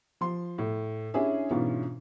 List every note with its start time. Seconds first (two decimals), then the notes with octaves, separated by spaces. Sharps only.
0.21 F3 C6
0.58 A2
1.14 C#4 D4 E4 G#4 C#5 E5
1.51 G#2 B2 E3 C#4 D4 F4